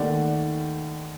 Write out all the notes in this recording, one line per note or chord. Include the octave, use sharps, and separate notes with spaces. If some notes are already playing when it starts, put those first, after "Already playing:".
Already playing: D#2 D#3 A3 D5 F#5